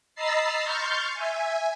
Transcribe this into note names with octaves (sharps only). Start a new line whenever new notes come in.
D#5 A#5 B5 E6 A6 C7
C6 C#6 F6 G6 A6
E5 G#5